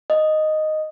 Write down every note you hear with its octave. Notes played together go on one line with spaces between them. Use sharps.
D#5